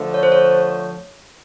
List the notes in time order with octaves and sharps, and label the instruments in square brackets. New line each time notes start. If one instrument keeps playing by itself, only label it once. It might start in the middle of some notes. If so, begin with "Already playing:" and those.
Already playing: [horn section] D3 F3 A3
[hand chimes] C#5
C5
C#5